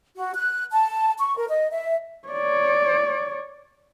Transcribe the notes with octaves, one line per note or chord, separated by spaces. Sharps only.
F#4
F#6
A5
C#6
A#4
D#5
E5
C#5 D5